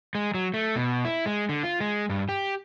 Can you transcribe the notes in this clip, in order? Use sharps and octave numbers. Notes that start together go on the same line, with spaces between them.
G#3
F#3
A3
B2
E4
G#3
D3
F4
G#3
G2
G4